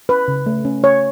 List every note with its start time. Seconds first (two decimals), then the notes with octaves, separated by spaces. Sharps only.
0.09 C#4 B4
0.28 C#3
0.46 A3
0.65 C#4
0.83 C#4 C#5